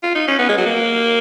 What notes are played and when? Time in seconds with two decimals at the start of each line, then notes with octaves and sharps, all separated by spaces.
0.03 F4
0.15 D#4
0.28 C#4
0.39 B3
0.49 G#3
0.58 F#3
0.66 A#3